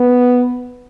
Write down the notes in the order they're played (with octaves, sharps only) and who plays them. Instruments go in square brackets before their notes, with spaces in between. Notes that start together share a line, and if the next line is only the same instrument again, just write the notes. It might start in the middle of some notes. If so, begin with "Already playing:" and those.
Already playing: [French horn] B3